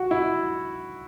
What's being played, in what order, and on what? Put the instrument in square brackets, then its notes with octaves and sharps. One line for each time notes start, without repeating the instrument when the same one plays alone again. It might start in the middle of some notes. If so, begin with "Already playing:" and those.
Already playing: [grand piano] F#4
E4